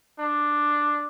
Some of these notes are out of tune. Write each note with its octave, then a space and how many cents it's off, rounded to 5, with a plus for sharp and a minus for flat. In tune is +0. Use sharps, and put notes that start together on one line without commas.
D4 +5